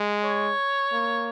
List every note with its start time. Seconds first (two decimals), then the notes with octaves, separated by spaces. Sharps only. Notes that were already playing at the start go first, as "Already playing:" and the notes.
Already playing: G#3
0.24 C#5
0.92 A#3